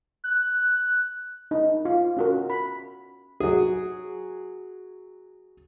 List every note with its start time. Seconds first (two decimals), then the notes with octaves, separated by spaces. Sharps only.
0.24 F#6
1.51 D#4
1.85 F4
2.17 C#4 F#4 A#4
2.50 B5
3.40 F#3 G#4